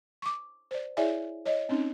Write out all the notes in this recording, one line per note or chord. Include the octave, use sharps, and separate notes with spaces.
C#6 D6
C5 D5
E4 G#4 C#5 D5 E5 G#5
C#5 D#5
C4 C#4 D#4